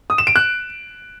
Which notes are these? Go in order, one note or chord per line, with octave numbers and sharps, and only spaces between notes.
D#6
E7
D7
F#6